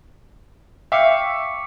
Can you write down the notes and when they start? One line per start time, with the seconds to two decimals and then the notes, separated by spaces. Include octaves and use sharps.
0.92 E5 F5 G5 C#6 D6 C#7